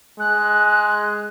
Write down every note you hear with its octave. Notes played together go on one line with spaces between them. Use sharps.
G#3 F#6